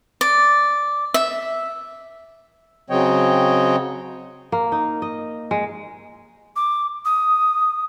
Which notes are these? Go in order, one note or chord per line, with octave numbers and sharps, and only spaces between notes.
D5
E5
C#3 F#3 C4 C#5 D#5 G5
A#3
D#4
D#5
G#3
D6
D#6